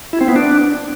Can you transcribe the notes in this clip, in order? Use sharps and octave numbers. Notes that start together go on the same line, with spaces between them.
E4
C4
B3
D4